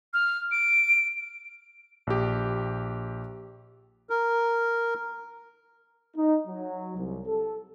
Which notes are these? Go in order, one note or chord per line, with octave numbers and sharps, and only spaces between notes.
F6
D7
A#1 G4
A#4
D#4
F#3
C2
A4